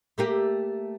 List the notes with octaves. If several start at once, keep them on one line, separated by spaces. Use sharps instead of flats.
A3 A#3 G4